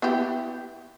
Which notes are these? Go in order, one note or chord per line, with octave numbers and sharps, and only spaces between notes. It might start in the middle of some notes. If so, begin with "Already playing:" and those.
B3 E4 G4